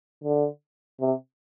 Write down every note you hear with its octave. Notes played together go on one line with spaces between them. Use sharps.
D3
C3